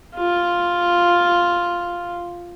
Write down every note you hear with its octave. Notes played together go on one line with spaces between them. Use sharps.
F4